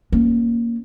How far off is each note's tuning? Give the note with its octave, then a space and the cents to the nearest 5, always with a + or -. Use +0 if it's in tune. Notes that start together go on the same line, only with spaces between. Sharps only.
A#3 +0 C#4 +0